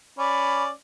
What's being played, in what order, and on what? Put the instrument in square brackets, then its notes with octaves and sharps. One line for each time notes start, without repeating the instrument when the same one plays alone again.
[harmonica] C#4 D5 [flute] B5